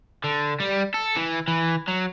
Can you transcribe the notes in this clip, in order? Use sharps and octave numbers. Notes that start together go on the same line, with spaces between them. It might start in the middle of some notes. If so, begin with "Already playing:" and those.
D3
G3
A4
E3
E3
F#3